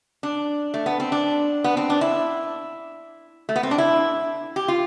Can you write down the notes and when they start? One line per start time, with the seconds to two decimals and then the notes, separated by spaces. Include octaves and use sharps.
0.23 D4
0.74 A3
0.86 B3
1.00 C4
1.12 D4
1.64 B3
1.77 C4
1.90 D4
2.01 E4
3.49 A3
3.56 B3
3.63 C4
3.71 D4
3.78 E4
4.56 G4
4.68 F4